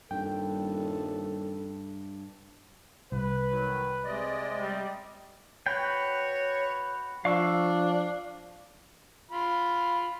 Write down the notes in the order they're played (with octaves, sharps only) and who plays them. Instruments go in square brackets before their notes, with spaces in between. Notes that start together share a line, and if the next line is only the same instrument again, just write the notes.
[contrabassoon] D#1 [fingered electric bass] G2 [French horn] A4 [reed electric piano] G5
[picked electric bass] C2 [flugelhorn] B4
[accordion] D#3 F#3
[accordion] C3 D5 D#5 [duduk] G#3
[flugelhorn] G3
[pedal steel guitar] F#4 B4 G5 [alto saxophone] C#5
[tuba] F3 [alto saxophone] D4 [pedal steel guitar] F5 C#6 E6
[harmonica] F4 B5